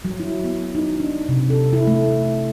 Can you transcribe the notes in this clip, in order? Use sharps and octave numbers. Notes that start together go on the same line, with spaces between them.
F#3
E4
B3
D#4
D4
C3
A4
E4
A3